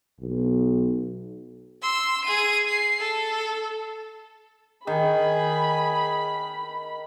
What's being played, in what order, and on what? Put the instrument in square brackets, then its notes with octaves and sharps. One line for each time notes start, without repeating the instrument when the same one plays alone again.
[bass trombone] B1
[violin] C6 E6
G#4 D#7
C7
A4
[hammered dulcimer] D#3 [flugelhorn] G#4 [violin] B5